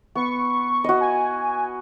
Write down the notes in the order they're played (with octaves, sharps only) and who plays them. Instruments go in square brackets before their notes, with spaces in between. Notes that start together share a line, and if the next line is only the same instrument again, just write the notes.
[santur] B3 [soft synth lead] C#6
[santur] F#4 D#5
[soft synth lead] G#5